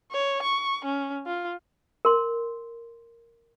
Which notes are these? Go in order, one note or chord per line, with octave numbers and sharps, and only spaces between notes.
C#5
C#6
C#4
F4
A#4 C6